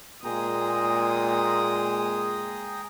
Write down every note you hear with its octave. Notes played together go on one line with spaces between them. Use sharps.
A#2 G#3 G#4 G5 A#5 D#6